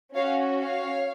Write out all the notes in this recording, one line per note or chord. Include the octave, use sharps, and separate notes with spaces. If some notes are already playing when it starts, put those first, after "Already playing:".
C#4 F#4 C#5 F5
C#5 F5